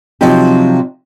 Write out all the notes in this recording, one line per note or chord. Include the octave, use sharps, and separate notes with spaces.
C3 F3 F#3 C4 D#4 G4